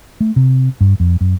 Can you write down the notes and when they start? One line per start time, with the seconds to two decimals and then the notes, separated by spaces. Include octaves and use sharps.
0.21 A3
0.36 C3
0.81 G2
1.00 F2
1.21 F#2